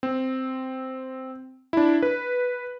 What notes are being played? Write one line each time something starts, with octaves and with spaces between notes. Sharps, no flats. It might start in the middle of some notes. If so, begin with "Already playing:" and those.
C4
D4 E4
B4